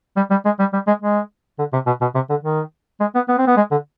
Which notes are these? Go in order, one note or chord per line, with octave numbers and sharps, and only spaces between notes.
G3
G3
G#3
G3
G3
G#3
G#3
D3
C3
B2
B2
C3
D3
D#3
G#3
B3
B3
C4
B3
G#3
D3